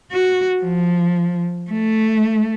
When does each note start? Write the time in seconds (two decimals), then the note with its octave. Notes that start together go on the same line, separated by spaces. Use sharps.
0.12 F#4
0.63 F3
1.71 A3